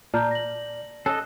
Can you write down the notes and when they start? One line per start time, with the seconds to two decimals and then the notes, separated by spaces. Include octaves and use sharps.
0.14 A#2 D5 A5 A#5 F6 G6
0.31 A#6 F#7
1.06 C#4 A4 D#5 F#6